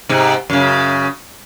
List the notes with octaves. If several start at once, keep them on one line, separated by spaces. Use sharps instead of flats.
G#2 C3
F#2 C#3